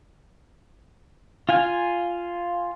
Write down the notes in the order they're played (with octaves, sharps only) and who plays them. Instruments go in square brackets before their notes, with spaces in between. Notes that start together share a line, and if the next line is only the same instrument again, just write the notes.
[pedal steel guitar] F4 F5 G#5